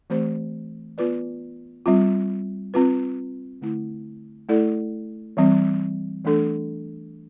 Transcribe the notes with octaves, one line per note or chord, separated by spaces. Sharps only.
E3 A3 C4 G4 C5
B3 F4 B4 D5
G3 C4 F4
C4 F4 B4
D3 A3 E4
A3 E4 A4 D5
E3 G3 C4
E3 A3 D4 A4